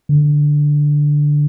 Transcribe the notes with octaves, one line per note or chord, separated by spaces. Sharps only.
D3